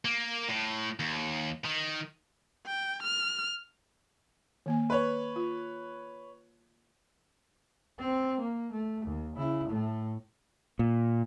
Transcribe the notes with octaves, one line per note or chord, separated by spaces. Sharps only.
A#3
A2
D#2
D#3
G5
F6
D#3 A#3 G#5
B4 C#5
F4
C4
A#3
A3
D#2
C#3 E4
A2 A3
A#2